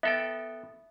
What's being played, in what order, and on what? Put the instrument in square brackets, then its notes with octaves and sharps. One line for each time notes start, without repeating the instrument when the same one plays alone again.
[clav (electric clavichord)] B3 A4 G5 [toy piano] E5